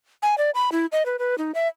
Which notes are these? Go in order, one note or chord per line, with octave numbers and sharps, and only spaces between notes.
G#5
D5
B5
E4
D#5
B4
B4
D#4
E5